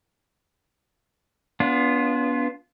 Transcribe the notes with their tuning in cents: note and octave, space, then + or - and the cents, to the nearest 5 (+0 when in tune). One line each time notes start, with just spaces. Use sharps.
B3 -10 D4 -45 F4 +0